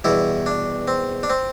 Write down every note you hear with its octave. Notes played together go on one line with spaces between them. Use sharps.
E2 B2 G3 E4
D4
C4
D4
C4